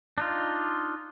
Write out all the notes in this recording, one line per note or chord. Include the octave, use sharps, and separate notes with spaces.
D4 D#4 F4